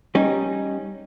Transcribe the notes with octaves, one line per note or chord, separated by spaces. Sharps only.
G3 C#4 D#4